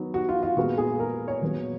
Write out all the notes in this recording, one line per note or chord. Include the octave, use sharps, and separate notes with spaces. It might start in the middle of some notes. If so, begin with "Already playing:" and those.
Already playing: D#3 F#3 B3
F#4
F4
F4
A#2 G#3 B3 F#4
G#4
A#4
C#5
A#2 F#3 B3